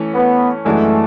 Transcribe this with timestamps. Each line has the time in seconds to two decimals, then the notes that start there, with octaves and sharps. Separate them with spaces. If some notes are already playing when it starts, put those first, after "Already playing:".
Already playing: E3 A3 C#4
0.15 B3
0.65 F#2 E3 G#3 A3 D4 F#4